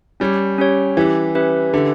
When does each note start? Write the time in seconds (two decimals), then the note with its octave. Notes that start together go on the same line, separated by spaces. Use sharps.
0.20 G3 C#4 G4 C#5
0.58 C#4 G4 C#5
0.97 E3 C#4 G4 B4 E5
1.35 C#4 G4 B4 E5
1.73 D3 C#4 G4 B4 E5